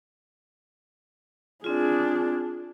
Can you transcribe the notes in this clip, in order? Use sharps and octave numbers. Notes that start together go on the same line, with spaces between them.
C4 D4 F4 G#4